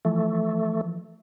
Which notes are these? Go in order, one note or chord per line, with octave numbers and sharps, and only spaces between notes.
E3 F3 A3